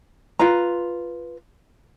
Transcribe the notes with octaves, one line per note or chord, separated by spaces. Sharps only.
F4 B4 A#5